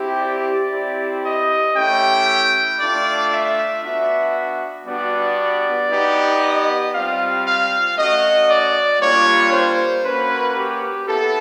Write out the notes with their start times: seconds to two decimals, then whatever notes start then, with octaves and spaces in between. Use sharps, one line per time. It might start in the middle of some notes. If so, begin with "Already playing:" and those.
Already playing: C4 E4 G4
0.20 D5
0.72 C4 E4 G4
1.24 D#5
1.75 A3 C#4 E4 G4 G5
2.79 A3 D4 F4 D5
3.31 E5
3.82 B3 D4 F#4 E5
4.86 G3 B3 D4 F#4 D5
5.90 B3 D#4 G4
6.42 D#5
6.93 G3 C4 F4 F5
7.45 F5
7.97 A3 C#4 F#4 D#5
8.49 D5
9.00 G3 A#3 D4 F4 C#5
9.52 C5
10.04 A#3 C#4 F#4 B4
10.56 G4
11.07 B3 E4 A4